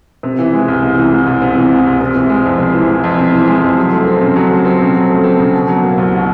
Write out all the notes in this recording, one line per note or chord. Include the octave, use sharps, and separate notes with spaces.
C3
E3
G#3
C2
C3
E3
G#3
C2
C3
E3
G#3
C2
C3
E3
G#3
F2
C3
E3
G#3
F2
C3
E3
G#3
F2
F#3
A3
C4
C#3
F#3
A3
C4
C#3
F#3
A3
C4
C#3
B2
F#3
A#3
C2
B2